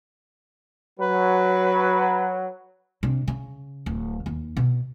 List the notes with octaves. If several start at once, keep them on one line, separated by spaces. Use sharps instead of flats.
F#3 B4
C3 D4
C#3
D1
D#2
B2